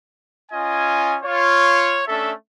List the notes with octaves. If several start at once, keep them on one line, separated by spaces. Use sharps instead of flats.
C#4 F4 D#5 G#5
F4 C#5
A3 C#4 D4 A4 E5